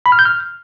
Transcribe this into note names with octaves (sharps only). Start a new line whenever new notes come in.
B5
F6
G6
F6